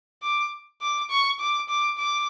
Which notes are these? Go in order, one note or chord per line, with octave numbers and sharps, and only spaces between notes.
D6
D6
C#6
D6
D6
D6